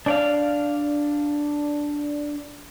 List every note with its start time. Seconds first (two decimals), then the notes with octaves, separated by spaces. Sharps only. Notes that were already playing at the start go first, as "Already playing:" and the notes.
0.06 D4 D5 F5